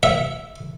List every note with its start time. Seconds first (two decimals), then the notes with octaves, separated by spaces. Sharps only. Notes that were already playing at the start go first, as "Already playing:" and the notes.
0.03 E5